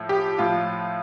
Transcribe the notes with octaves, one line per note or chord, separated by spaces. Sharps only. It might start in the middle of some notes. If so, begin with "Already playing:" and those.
Already playing: A2 F3
G4
A2 F3 F4